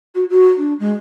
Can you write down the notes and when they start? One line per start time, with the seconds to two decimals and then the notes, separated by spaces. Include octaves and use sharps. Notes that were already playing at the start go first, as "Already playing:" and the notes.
0.15 F#4
0.30 F#4
0.57 D4
0.80 G#3